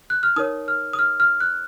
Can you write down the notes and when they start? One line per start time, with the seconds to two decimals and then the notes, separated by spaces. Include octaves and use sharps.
0.10 F#6
0.23 F6
0.36 D#4 A#4 C#5 D#6
0.68 F6
0.93 D#6
0.99 F6
1.20 F6
1.40 F#6